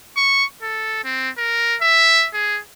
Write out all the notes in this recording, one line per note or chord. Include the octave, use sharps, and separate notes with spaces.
C#6
A4
C4
A#4
E5
G#4